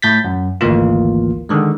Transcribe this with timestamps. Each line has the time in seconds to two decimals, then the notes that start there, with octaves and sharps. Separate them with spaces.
0.02 A2 G6 A6 B6
0.24 F#2
0.61 G#1 D2 E3 A#3 F4
1.49 D3 D#3 G#3